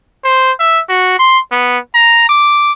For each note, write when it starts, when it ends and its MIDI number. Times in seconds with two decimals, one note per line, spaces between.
0.24 0.52 72
0.60 0.80 76
0.89 1.17 66
1.19 1.39 84
1.52 1.78 59
1.94 2.29 82
2.29 2.72 86